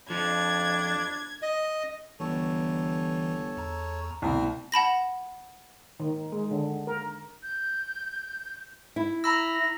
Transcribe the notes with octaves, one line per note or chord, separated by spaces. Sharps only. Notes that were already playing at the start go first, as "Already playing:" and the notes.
F2 F3 D4 G#6
D#5
G1 E3 A4 C#5
E2 A#5
C2 B2 A3 B3
F#5 A5 B5 A#6
D#3
G#3
D3
A#4
G6
E4
A#5 B5 E6 A#6